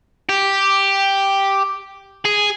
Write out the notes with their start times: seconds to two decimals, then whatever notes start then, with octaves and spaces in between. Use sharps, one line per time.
0.29 G4
2.25 G#4